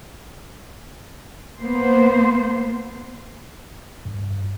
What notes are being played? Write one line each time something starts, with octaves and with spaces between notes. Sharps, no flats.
A#3 B3 C5
G2